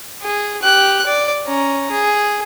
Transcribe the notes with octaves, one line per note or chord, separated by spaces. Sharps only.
G#4
G4 F#6
D5
C#4 A#5
G#4